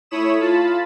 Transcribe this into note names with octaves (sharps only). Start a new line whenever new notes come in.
A3 E4 C#5 B5 D#6 E7
F4 A5 B5